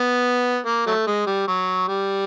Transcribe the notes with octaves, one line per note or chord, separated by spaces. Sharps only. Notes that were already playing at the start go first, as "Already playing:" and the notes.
Already playing: B3
A#3
F#3 A3
G#3
G3
F#3
G3